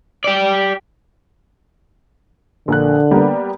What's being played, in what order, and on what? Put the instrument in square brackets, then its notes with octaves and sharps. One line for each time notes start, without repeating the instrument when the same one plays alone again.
[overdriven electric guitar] G4 D5
[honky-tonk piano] A#1 A#4 F#6 [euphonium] D3
[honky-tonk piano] G3 A#3 B3